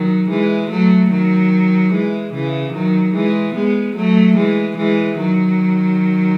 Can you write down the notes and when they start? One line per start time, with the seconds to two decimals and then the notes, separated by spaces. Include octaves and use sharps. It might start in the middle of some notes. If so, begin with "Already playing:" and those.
Already playing: D#3 F#3
0.29 E3 G#3
0.70 F#3 A3
1.10 D#3 F#3
1.92 E3 G#3
2.34 C#3 E3
2.73 D#3 F#3
3.14 E3 G#3
3.55 G#3 B3
3.96 F#3 A3
4.36 E3 G#3
4.77 E3 G#3
5.18 D#3 F#3